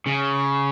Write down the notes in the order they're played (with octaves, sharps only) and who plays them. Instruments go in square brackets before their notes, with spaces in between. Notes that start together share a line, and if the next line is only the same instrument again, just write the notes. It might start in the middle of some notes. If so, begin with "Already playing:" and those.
[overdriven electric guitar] C#3